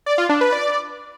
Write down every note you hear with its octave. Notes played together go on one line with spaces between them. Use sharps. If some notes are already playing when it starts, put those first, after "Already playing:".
D5
F4
D4
B4
D5